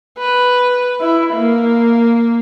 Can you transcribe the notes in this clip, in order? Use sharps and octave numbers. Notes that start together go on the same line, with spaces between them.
B4
E4
A#3